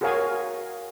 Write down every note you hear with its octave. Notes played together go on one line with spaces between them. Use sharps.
F#4 G#4 A#4 C#5 F5 G#5